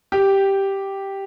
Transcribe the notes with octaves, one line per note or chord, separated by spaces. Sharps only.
G4